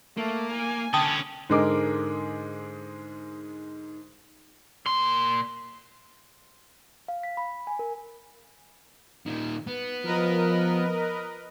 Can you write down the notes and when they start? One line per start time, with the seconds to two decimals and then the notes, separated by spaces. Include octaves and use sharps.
0.17 A3 A#3
0.53 G#5
0.94 D3 C#4 G5 A5 D#6
1.49 G#2 D3 G#3 A#4 D6
4.86 A#2 C6
7.08 F5
7.23 B6
7.37 B5
7.67 G#5
7.79 A#4
9.26 A#2 D#3
9.67 B3
10.05 F3 A#4 B4 D#5